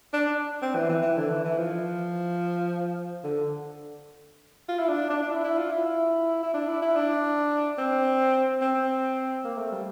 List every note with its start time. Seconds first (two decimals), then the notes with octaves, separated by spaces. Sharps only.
0.13 D4
0.62 C4
0.75 E3
0.89 E3
1.02 E3
1.17 D3
1.30 E3
1.45 E3
1.57 F3
3.23 D3
4.68 F4
4.79 E4
4.88 D4
5.10 D4
5.22 D4
5.31 E4
5.44 E4
5.58 F4
5.72 E4
6.43 E4
6.54 D4
6.68 E4
6.82 E4
6.96 D4
7.78 C4
8.61 C4
9.44 A#3
9.58 A3
9.71 G3